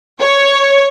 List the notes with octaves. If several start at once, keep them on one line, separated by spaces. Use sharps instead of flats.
C#5